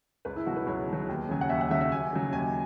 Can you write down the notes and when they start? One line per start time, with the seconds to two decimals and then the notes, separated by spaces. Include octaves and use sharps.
0.25 C#2 B4
0.36 E4
0.46 B2 F#3 F#4
0.56 B4
0.66 C#2 C#5
0.88 B2
0.93 F#3
1.08 D#2
1.29 C#3 F#3 G#5
1.41 F#5
1.49 D#2 E5
1.61 F#5
1.70 C#3 F#3 E5
1.81 E5
1.91 D#2 G#5
2.13 C#3 F#3
2.33 D#2 G#5